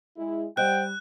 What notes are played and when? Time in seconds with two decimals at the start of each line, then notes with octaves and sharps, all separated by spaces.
0.16 G#3 E4
0.57 G3 C5 D#5 F#5 G5 F#6